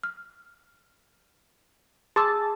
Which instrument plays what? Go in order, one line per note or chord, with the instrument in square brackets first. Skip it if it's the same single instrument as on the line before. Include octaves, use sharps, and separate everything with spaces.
[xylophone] F6
[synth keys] G#4 A5 [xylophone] C6 D6 E6